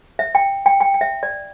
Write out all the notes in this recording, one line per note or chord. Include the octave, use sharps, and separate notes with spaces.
E5
G5
G5
G5
G5
E5
D5